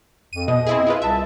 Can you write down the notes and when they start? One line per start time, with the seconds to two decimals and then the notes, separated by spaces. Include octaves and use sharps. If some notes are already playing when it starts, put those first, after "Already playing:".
0.33 F2 D#7
0.48 B2 D#5
0.66 C4 E4 G#4
0.87 E4 F4 B4
1.02 C2 E5 A5